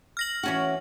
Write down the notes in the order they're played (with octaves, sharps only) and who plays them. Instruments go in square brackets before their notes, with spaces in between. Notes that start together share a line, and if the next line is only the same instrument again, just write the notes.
[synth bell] F6 A#6 F#7
[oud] E3 C#4 F#4